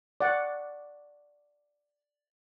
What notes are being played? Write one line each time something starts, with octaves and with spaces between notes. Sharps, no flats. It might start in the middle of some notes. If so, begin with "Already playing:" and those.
D5 F#5